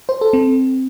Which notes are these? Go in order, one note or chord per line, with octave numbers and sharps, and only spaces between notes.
C5
A4
C4